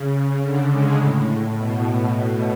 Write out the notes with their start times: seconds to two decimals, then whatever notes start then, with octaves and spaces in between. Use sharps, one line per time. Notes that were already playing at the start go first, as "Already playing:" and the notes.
Already playing: C#3
0.42 D3
0.72 G#3
0.99 A2
1.56 B2